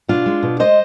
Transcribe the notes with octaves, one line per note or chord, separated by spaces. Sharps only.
B2 D4 F4
G#3
B2
G#3 C5 D#5